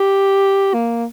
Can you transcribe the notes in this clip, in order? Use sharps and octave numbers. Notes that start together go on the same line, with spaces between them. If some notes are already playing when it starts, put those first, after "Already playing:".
Already playing: G4
A#3